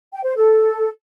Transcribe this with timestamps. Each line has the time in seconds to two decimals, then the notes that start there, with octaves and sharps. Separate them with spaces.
0.13 G5
0.25 C5
0.36 A4